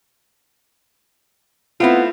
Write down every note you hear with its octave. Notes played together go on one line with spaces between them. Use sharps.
A3 B3 C4 E4 F4